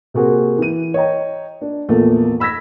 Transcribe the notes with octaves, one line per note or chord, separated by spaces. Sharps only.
C3 A#3 C4 F#4 G#4 A#4
E3 D#7
C#5 D#5 G5 A#5
D4
A#1 E2 A3 A#3
B5 E6 G#6 A#6 B6